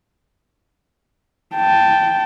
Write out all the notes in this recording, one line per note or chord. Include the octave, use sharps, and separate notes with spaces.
G5 A5